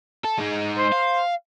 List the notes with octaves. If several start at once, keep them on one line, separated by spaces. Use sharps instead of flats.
A4
G#3 D#4
C5
F5